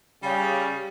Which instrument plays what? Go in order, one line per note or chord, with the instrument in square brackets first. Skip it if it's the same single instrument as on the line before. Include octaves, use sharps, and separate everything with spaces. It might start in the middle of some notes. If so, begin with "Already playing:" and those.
[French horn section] C#3 [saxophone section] G3